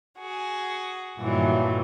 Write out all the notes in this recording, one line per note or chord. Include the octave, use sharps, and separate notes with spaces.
F#4 G#4
G2 A#2 D#3 E3 F#3 A3